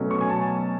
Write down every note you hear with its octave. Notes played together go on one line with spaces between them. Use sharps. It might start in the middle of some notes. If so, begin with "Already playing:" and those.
Already playing: B2 F#3 A3 C#4
C#6
G#5
A5